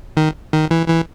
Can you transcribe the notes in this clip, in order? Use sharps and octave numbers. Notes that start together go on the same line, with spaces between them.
D#3
D#3
E3
E3